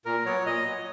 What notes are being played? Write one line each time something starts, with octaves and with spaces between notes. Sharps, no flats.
A#2 A#4
F#3 B3 C#5
A#2 D#5
F#3 B3